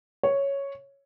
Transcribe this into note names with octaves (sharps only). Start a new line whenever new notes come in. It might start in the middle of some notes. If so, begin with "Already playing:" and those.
C#5